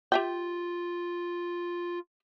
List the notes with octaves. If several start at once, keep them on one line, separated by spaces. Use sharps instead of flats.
F4 G4 E5 G5